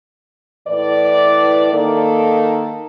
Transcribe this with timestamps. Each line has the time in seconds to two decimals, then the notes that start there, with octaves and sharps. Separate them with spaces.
0.68 A2 E3 B4 D5
1.73 D#3 A#3 A4